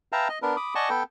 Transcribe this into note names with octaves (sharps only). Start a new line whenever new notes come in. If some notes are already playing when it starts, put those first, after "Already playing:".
B4 E5 F5 G5 A5 A#5
D#5
B3 D4 A#4 B4
B5 D6 D#6
D5 D#5 F#5 G#5 A5 C#6
B3 A4 B4 G5